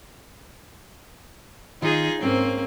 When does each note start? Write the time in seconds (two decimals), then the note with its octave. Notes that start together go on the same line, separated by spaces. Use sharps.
1.82 D#3 D#4 F4 G#4
2.21 G#2 A#3 C4 C#4 C#5